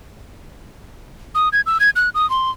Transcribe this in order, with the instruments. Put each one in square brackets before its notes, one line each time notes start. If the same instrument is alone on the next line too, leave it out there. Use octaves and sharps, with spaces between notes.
[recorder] D#6
G#6
E6
G#6
F#6
D#6
C6